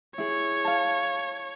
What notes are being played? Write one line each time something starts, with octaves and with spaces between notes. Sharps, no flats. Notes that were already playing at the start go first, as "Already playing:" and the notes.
E4 G#4 C#5
F5 A5